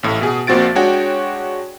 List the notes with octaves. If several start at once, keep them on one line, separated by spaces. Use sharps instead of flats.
A1 A2
B2 G#4
A#1 A#2 C4 F#4 A6 D7
G#3 D4 F#4 C#5 G5